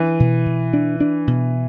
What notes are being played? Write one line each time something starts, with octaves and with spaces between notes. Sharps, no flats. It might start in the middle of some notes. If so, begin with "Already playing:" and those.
Already playing: E3 D4
B2
B2
D4
D4
B2